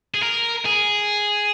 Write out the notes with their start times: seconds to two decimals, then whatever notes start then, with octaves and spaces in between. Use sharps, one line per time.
0.15 G#4
0.23 A#4
0.66 G#4